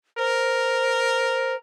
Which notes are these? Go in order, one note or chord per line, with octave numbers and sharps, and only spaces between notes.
A#4 C5